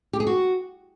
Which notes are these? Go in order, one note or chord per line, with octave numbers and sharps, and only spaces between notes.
G4
G#4
F#4